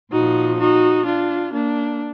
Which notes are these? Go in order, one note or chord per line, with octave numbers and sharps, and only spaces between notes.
A#2 F3 D#4 F#4
D#4 F#4
D4 F4
A#3 D4